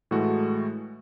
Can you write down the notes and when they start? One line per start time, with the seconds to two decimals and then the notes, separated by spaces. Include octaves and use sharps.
0.11 A2 E3 G#3 A3 F#4